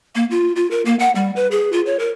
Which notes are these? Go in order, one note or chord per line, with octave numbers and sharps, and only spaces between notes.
A#3
F4
F4
A#4
A#3
F#5
G3
B4
G#4
F4
C#5
A#4